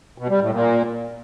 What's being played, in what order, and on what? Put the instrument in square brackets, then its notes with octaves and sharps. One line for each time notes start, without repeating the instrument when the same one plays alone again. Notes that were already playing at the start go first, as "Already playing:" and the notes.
[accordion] B2
G3
A2
A#2